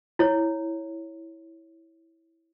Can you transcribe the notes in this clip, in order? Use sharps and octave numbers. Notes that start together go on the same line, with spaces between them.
E4 C#5